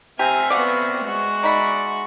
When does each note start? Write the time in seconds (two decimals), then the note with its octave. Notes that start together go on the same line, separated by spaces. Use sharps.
0.19 C4 G4 E5 G#5 A#5 F6
0.50 B3 F#4 D5 F5 F#5
1.05 G#3 F#4
1.43 D#4 D5 E5 B5